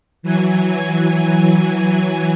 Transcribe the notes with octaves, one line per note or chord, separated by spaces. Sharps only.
E3 F#3 G#5